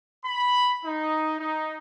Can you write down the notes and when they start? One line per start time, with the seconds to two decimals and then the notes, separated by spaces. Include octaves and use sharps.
0.25 B5
0.85 D#4
1.39 D#4